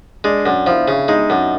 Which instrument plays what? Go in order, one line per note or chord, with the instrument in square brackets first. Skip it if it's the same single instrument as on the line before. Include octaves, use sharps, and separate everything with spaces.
[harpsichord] G#3 [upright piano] D4 D5
[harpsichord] F#2
[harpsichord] F3 [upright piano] E4 E5
[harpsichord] C#3
[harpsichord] G#3 [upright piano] D#4 D#5
[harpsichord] F#2